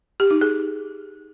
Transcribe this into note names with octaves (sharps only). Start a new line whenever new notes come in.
G4
D#4
G#4